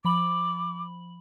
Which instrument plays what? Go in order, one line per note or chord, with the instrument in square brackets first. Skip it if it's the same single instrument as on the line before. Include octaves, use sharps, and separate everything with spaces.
[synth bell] F3 B5 F#7 [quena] D6